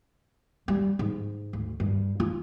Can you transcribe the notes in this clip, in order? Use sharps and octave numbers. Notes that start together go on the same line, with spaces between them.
G3
G#2
D2
G2
F4